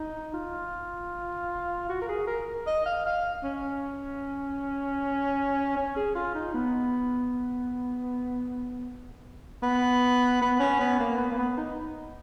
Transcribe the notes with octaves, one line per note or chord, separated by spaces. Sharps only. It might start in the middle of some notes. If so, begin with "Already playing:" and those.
Already playing: D#4
F4
F#4
A#4
G#4
A#4
D#5
F5
F5
C#4
C#4
G#4
F4
D#4
B3
B3
B3
C#4
B3
A#3
B3
A#3
B3
D#4